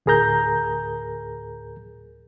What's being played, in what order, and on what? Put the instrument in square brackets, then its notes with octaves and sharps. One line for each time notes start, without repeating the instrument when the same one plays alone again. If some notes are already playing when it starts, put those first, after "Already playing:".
[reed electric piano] D2 A2 G#4 A#4 A#5 G6